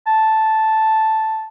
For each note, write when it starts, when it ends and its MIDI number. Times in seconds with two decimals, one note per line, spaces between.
0.07 1.48 81